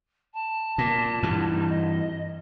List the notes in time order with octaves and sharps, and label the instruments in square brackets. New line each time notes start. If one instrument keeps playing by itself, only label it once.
[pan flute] A5
[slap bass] A#2
G2 E3
[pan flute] D#4
D#5